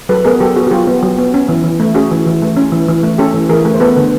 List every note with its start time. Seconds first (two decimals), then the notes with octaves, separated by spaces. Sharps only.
0.09 F#3 A4 B4
0.25 B3 G#4 A#4
0.40 F#3 G4 A4
0.56 B3 F#4 G#4
0.67 F#4
0.71 F#3 F4 G4
0.87 B3
1.03 F#3
1.18 B3
1.34 C#4
1.49 E3
1.64 E3
1.80 A3
1.95 C#4 F#4 G#4
2.11 E3
2.27 E3
2.42 A3
2.57 C#4
2.72 E3
2.89 E3
3.03 A3
3.18 C#4 G4 A4
3.34 E3
3.49 E3 G#4 A#4
3.65 A3
3.74 C5
3.80 B3 A4 B4
3.96 D3